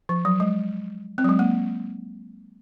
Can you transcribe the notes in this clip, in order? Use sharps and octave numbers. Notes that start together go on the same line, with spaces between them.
F3
F#3
G#3
C4
F#3
G#3
A#3